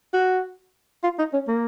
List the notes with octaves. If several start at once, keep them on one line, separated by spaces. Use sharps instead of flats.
F#4
F4
D#4
C#4
A#3